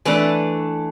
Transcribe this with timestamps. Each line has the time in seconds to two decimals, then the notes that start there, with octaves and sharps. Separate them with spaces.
0.05 E3 A3 D4 B4